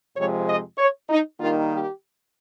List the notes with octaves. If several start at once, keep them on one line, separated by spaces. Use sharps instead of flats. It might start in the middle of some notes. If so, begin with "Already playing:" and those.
F2 C3 F3 G#3 C#5
D#5
C#5
D#4
D#3 G3 A#3 D#4 F4
G4